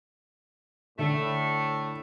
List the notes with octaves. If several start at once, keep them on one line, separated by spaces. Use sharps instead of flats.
A2 D3 A3